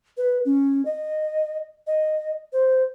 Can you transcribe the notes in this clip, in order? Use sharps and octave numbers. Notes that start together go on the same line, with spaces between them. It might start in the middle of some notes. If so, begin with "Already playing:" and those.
B4
C#4
D#5
D#5
C5